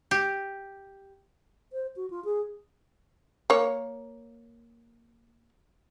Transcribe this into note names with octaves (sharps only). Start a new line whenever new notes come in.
G4
C5
F#4
F4
G#4
A#3 C#5